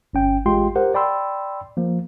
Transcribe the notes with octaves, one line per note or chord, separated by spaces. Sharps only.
G1 C#4 G5
A1 G#3 F4 G4 G5 C6
G4 A#4 C5 F#5
D5 G5 B5 C6 E6
F3 A#3